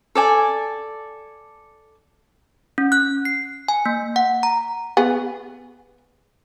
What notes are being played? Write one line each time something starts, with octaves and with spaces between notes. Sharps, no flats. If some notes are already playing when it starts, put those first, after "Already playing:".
A4 D5 G#5
C#4
F#6
C7
G#5
A#3
F#5
A#5
B3 G#4